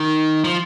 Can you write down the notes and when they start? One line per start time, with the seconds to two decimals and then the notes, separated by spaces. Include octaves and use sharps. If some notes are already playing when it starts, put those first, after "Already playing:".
Already playing: D#3
0.44 F3